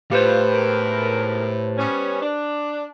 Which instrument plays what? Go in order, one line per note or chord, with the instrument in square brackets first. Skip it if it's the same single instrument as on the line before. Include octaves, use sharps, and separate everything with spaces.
[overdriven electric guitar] A2 [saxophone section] G3 F4 [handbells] G4 B4 C5
[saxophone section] E2 G#2 A#4
G3 B3 C#4
D4